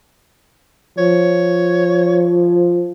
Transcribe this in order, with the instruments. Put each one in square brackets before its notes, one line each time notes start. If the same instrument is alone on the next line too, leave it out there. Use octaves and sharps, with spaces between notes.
[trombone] F3 [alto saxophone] C#5